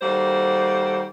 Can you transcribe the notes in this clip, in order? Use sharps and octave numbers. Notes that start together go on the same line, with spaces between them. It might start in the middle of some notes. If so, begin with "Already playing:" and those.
D#3 G3 A#3 F#4 A4 C5